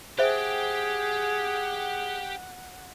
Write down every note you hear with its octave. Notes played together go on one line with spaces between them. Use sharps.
G4 G#4 C5 E5 F#5 G5